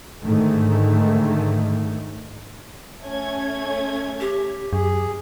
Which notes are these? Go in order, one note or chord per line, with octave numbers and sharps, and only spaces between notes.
G#2 D3 D#3 A3
A3 C#4 G#6
G4
F#2 G#4